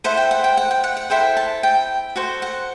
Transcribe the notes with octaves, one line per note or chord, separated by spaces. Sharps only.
E4 A4 C5 F#5
G5
F#5
G5
F#5
G5
F#5
F#5
E4 A4 C5 G5
A5
G5
F#4 A4 C5
F#5